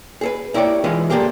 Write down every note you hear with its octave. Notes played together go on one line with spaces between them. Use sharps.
G#4 A4 B4
A#3 E4 G4 C#5 D5
E3 G#3 F4 B4 G#5
D3 F3 A#3 G4 G#4 A#4